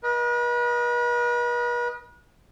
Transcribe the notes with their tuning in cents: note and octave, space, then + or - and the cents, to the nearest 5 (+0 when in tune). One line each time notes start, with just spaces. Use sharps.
B4 -40 D#5 +0